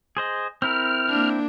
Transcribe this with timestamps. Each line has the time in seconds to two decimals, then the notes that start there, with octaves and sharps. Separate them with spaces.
0.17 G#4 C5 D#5
0.62 C4 E4 A#4 F6
1.09 A#3 D4